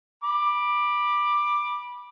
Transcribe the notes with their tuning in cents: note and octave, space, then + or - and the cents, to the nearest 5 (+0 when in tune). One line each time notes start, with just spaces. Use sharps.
B5 -15 D6 +15